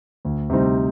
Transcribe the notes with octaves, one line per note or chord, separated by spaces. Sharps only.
D2
C3 G3 C4 D#4